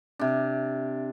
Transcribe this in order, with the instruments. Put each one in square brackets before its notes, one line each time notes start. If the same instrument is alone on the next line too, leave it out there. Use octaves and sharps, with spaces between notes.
[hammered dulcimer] C3 D4